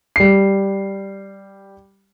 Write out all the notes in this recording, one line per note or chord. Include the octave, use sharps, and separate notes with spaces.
G3 C7